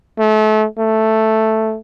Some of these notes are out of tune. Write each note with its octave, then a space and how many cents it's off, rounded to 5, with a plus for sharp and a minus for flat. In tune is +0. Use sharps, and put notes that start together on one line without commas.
A3 -30
A3 +0